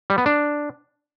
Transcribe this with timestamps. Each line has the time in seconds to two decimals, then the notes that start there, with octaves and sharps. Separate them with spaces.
0.10 G3
0.18 B3
0.26 D4